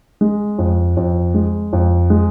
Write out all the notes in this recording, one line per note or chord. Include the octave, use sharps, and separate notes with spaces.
G#3
F2
F2
G#3
F2
G#3